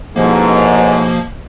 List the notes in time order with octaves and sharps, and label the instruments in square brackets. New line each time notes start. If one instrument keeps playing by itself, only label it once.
[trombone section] A1 G#2 [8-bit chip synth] B2 F3 A#3